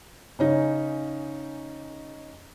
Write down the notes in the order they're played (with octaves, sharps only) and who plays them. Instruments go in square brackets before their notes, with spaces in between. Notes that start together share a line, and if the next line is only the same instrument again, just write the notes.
[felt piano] C#3 C#4 D#4